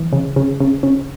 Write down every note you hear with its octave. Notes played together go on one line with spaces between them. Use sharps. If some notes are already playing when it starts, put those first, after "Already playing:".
Already playing: E3
C#3
C#3
C#3
C#3